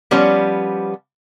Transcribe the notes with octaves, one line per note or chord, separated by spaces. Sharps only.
F3 G3 B3 C#4